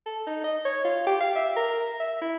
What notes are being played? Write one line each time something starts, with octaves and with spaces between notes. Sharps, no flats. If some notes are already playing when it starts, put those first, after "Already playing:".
A4
D#4
D#5
C#5
F4
G4
F5
E5
A#4
E5
E4